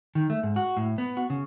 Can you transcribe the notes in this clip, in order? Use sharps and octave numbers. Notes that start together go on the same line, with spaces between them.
D#3
A3
G#2
F#4
A2
B3
F#4
C#3